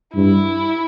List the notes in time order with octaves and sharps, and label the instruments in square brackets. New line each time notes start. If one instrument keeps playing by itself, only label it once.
[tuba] G2 [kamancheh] E4